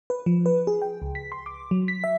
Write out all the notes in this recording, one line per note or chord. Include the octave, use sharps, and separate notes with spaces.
B4
F3
B4
G#4
G5
C#2
B6
C6
D6
F#3
B6
E5